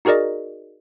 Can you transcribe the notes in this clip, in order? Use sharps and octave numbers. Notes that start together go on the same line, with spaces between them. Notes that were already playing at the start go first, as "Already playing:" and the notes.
D#4 F#4 G#4 A#4 D5 D#5